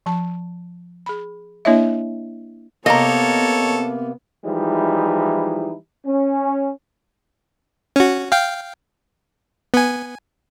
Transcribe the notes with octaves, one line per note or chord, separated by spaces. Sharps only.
F3 A5
G#4 B5
A#3 D4 E4 C#5 D#5 E5
C3 A#3 B3 A4 C#5 D#5 A#5
E3 F3 G3 G#3 D#4 E4
C#4
C#4 F#4
F5 G5
B3 G#5